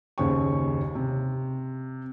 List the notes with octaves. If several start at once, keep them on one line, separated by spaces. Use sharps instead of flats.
F#1 D#2 C#3 C5 G5 C#6
C3